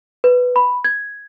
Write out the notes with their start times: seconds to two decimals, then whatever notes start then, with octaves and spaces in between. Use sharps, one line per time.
0.24 B4
0.56 B5
0.84 G#6